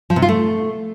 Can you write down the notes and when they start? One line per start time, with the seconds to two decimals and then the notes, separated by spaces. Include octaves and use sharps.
0.10 F3
0.16 C3
0.22 F4
0.29 A3